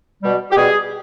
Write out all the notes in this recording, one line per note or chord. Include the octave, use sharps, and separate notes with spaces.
B2 G3
G4
B2 G3 G#4